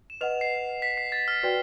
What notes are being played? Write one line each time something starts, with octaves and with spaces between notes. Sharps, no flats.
E7
B4 D#5 F#5 F7
C7
B6
C7
A6
F6
F#4 B4 D5 G5